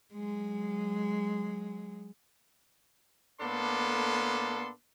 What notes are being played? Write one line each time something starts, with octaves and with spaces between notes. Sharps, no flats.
F#3 G#3
A2 A#3 B3 D4 A4 C6